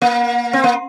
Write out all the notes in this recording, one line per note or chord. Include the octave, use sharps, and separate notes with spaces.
A#3
C4
A#3